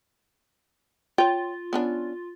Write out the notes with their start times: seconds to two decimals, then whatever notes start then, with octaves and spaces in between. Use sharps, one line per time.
1.18 F4 C#5 G5
1.73 B3 C#4 D4